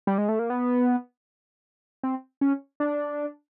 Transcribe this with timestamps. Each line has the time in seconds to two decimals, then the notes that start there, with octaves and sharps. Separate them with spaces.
0.07 G3
0.18 G#3
0.29 A3
0.39 A#3
0.50 B3
2.03 C4
2.41 C#4
2.80 D4